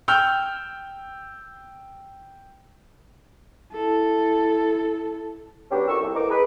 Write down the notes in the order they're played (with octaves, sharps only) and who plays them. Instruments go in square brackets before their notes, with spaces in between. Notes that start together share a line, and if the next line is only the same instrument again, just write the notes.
[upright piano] G5 E6 F6 G6
[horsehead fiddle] E4 A4
[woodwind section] F#3 B3 C#4 D4 G4
F2 D#3 A#4 C#6 E6
C2
A2 E3 A#3 D#4 A#5 D6
G#4 B4